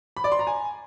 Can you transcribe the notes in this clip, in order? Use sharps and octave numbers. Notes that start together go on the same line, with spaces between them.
B5
D5
C6
A#5
G#5